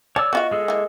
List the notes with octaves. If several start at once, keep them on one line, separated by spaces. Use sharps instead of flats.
C#5 D5 A5 E6
B3 F4 F#4 D#5 F5
G#3 G#4 A4
E3 A#3